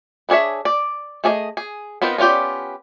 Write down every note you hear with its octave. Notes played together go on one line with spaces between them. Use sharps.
B3 D4 G#4 C#5 E5
D5
A3 G#4 D5 D#5
G#4
B3 C4 D#4 F4 A#4
B3 C#4 F4 G4 D5